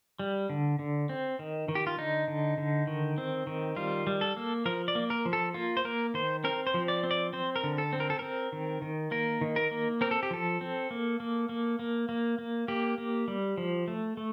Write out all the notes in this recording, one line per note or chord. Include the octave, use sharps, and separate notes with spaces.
G3
D3
D3
C4
D#3
D#3
G4
F4
D3 D#4
D3
D3
D#3
C4
D#3
G3 F4
G3
A4
A#3
F3 A#4
D5
A#3
A#4
F3
A4
A#3 F4
C5
A#3 A#4
D#3 C5
C4 A#4
C5
F3
D5
C4
D5
C4 C5
A#4
D3
A4
C4
A#4
A4
C4 A#4
D#3
D#3
A#3 A#4
D#3
A#4
A#3
C4 A#4
A4
G4
F3 A4
C4
A#3
A#3
A#3
A#3
A#3
A#3
A#3 G4
A#3
G3
F3
A3
A3